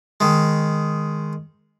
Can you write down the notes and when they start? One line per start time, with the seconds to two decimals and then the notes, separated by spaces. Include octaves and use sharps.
0.20 D#3 G#3